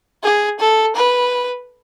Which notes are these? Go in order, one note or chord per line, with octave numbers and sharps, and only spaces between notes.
G#4
A4
B4